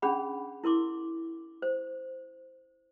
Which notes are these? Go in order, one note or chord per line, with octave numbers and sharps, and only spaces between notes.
C#4 D4 G#4 F#5 B5
E4 A#4 C6 D6
C5